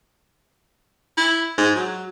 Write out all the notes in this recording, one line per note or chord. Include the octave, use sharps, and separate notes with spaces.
E4
G#2
F#3